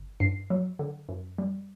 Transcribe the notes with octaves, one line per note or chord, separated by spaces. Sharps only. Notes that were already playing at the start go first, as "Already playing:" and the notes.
Already playing: G1
G2 C7
F#3
D3
F#2
G3